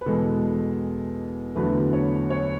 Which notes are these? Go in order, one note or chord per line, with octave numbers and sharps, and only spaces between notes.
B4
E2 B2 G#3 A4
E2 D3 F#3 A3 B4
C#5
C#5